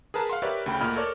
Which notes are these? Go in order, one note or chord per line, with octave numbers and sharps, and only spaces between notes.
G#4 A#4 B4 A5 A#5
F5 F#5 C6
G4 A#4 B4 C#5 D5 E5
D2 C#3 G5 B5
D2 A#2 D#5 B5 F6
A4 A#4 C#5 D5